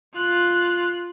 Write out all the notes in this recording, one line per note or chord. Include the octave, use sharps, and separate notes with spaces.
F4 F#6